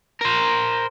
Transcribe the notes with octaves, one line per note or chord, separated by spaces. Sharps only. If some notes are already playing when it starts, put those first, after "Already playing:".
A#4 C5